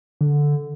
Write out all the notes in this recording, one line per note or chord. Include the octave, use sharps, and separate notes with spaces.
D3